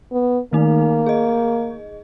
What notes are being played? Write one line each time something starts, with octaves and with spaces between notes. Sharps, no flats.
B3
D#3 A3 A#3 D#4
G#4 D#5